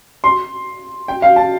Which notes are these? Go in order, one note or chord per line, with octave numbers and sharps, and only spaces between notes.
C6
G5
F5
A5